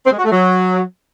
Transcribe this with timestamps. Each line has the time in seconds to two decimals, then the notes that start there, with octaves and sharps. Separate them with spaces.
0.06 C4
0.12 G#3
0.18 F#4
0.25 A3
0.31 F#3